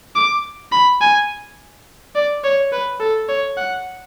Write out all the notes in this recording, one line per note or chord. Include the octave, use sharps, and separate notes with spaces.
D6
B5
G#5
D5
C#5
B4
A4
C#5
F#5